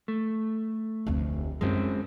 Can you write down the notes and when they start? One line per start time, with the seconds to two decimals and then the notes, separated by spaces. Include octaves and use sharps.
0.08 A3
1.07 F1 D2
1.61 F#2 G#3 C4 F4